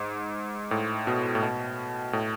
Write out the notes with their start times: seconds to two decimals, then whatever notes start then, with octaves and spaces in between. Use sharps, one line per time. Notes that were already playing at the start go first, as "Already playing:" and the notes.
Already playing: G#2
0.71 A2
1.07 B2
1.35 A2
1.43 B2
2.13 A2